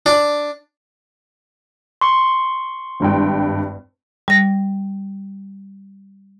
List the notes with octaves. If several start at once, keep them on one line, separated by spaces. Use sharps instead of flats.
D4
C6 C#6
G#1 G2 G5
G3 A#6